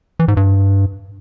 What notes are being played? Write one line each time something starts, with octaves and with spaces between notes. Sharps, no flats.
E3
G#2
G2